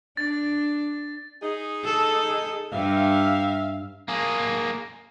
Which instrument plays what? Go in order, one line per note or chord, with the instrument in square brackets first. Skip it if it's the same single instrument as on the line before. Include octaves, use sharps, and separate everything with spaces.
[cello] D4 [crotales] A6
[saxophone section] D#4 G#4
[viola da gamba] A4
[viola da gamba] G2 [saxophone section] E5 F5
[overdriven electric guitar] A#3 G#4